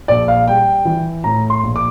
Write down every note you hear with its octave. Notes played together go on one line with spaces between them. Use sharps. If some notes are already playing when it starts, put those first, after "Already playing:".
A#1 D5
F5
G3 G5
E3
A2 A#5
C6
A#1
D6